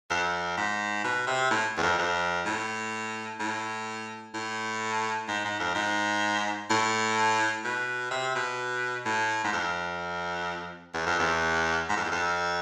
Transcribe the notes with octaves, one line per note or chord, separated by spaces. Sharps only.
F2
G#2
B2
C3
A2
E2
F2
F2
A2
A2
A2
G#2
G#2
F2
G#2
A2
B2
C3
B2
A2
G#2
F2
E2
F2
E2
G#2
F2
E2
F2